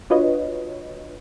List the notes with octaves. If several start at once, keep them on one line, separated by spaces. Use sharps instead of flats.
D4 F4 F#4 B4 C#5 D#5